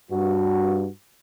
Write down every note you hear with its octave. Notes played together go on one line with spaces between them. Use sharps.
G2 F#4